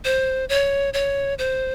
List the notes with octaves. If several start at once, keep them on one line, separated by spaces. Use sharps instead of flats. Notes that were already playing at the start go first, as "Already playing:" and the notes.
C5
C#5
C#5
C5